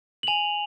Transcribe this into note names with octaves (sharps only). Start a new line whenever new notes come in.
F#7
G#5 F7